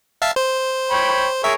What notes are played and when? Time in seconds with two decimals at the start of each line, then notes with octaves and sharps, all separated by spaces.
0.22 E5 F5 A5
0.36 C5
0.91 C#5 G5 B5
1.44 G#4 A#4 C#5 E5